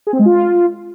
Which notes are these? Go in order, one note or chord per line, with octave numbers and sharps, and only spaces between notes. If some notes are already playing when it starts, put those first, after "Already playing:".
G#4
C4
G#3
F4